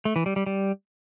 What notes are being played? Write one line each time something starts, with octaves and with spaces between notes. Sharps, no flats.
A3
E3
G3
G3
G3